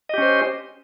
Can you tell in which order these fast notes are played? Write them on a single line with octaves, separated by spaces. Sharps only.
D#5 G4 C#4 C5